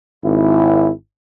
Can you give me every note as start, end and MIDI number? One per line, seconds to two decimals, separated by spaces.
0.24 0.90 32
0.24 0.90 64